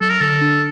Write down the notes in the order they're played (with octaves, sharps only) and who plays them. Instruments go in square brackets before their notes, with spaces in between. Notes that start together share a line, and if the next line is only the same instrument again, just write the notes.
[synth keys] F#3 [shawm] A4
[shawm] A#4
[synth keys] D3 [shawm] A4
[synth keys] D4